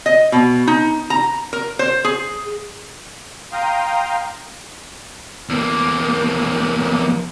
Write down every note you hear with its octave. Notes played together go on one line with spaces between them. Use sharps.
D#5
B2
D#4
A#5
A#4
C5
G#4
F5 G5 A#5 C6 D#6
E2 A#3